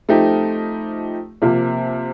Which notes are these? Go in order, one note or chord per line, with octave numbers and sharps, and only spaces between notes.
F3 A3 C4 D#4 G4
C3 F3 A#3